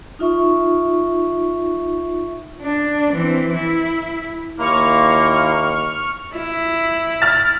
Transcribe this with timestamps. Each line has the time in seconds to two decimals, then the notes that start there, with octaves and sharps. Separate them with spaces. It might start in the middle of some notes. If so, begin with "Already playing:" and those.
0.19 D#4 F4 E5 C#6
2.62 D4
3.12 E3 C4
3.53 E4
4.59 D#2 A#3 E4 A#5 C6 C#6 F6
6.35 E4
7.22 F6 A6